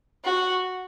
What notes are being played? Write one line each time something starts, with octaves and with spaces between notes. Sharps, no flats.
F#4